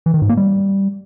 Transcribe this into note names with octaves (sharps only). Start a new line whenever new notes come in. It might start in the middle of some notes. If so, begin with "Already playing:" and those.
E3
D#3
G#2
A#3
G3